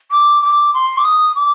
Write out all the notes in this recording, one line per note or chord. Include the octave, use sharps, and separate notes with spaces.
D6
D6
C6
D6
D#6
D6